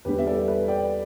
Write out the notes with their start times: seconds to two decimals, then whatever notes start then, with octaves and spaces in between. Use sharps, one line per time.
0.05 E2 D3 G3 G4 B4
0.18 E5
0.27 A4 D5
0.48 B4 E5
0.68 D5 G5